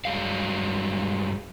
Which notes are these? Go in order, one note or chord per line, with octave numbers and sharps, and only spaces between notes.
G2 F3 F#3 G#3 F5